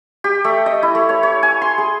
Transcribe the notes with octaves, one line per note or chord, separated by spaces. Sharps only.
G4
A3
D#5
E4
A3
C#5
C#5
G#5
C6
G#4